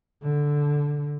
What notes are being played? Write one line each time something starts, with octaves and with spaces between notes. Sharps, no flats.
D3